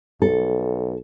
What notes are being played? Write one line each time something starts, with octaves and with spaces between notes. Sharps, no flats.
B1 A4